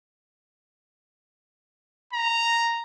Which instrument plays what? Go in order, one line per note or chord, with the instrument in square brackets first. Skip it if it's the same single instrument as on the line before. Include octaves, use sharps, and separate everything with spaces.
[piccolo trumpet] A#5